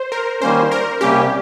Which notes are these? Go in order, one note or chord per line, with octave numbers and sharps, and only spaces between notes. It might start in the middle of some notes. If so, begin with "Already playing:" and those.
Already playing: C5
A#4
D#3 G3 A#3 C#4 C5
A#4
C3 G3 A#3 C#4 G4